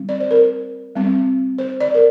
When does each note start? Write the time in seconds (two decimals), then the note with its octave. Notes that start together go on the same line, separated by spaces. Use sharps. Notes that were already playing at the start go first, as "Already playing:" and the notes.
Already playing: G3 C4
0.09 D5
0.20 C5
0.31 A#4
0.95 G3 C4
1.59 C5
1.80 D5
1.95 A#4